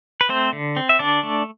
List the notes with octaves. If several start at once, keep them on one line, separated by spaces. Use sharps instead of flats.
B4
A3 C4 C5
D3
C4
E5
D3 D4 D5
A3